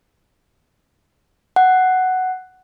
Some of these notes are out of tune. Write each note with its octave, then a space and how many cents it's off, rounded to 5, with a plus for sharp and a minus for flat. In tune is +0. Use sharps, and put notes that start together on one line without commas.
F#5 +5